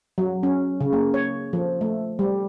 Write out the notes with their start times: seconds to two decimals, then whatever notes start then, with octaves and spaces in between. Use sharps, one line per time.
0.18 F#3
0.43 C#4
0.81 C#3
0.93 A#3
1.14 C#5
1.53 F3
1.81 A3
2.19 G3